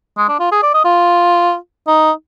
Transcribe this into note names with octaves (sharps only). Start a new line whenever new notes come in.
G#3
D4
F4
G#4
D5
D#5
F4
D#4